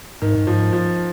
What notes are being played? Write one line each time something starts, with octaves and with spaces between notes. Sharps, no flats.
G#2 D#3
G2
G#2 F3
F3